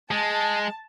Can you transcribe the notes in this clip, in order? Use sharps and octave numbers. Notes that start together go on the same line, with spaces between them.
G#3 A5